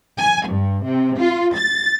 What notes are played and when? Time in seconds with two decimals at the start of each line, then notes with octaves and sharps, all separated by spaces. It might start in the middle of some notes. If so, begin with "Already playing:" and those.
0.18 G#5
0.48 G2
0.84 C3
1.18 F4
1.55 A6